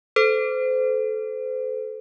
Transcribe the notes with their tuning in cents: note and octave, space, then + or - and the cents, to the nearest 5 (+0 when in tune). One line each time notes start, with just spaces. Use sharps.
A4 -20 C5 -30